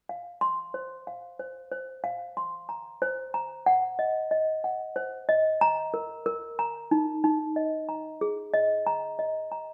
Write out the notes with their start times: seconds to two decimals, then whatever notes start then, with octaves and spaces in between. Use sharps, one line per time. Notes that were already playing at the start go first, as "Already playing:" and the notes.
0.09 F5
0.41 C6
0.74 C5
1.07 F5
1.40 C5
1.71 C5
2.04 F5
2.37 C6
2.69 A#5
3.02 C5
3.34 A#5
3.66 F#5
3.99 D#5
4.31 D#5
4.64 F#5
4.96 C5
5.29 D#5
5.61 A#5
5.94 A#4
6.26 A#4
6.59 A#5
6.91 D#4
7.24 D#4
7.56 D#5
7.89 A#5
8.21 G#4
8.54 D#5
8.87 A#5
9.19 D#5
9.52 A#5